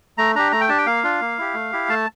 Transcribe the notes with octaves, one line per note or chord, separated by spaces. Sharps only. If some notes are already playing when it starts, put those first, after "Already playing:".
A3 A#5
D4 G4 A#5
A3 A#5
G5
D4 G4 A5
G5
A#3 F5
D4 F4
A#3
E4 G4
A3
E4 G4
A3 A5